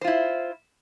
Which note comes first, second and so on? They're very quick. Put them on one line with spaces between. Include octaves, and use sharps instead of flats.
C5 F4 E4